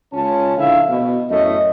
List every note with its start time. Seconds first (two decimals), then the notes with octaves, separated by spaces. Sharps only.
0.13 C#2 C#4 F4 A5
0.57 A#1 D3 E4 E5 F5
0.89 B2
1.31 A1 F#2 A3 C#4 E4 D#5